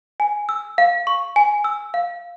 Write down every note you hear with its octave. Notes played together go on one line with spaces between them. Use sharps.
G#5
E6
F5
C#6
G#5
E6
F5